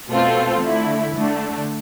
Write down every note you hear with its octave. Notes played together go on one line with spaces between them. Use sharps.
B2 A3 C4 F4 A4
D3 A3 E4
D3 A3 D4